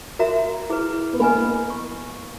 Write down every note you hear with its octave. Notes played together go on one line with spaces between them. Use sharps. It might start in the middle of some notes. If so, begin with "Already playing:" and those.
F#4 A#4 E5 A#5
E4 G#4 B4
B3
A#3 B4 D#5 G#5 B5
C#6